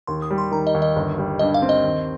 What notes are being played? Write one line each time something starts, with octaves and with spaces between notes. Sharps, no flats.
D#2 C6
D#6
G3
C6
D#3 A#5
D#5
D#2
D#5
G1
G3
G2 D#5
F5
C4
D#5
D#2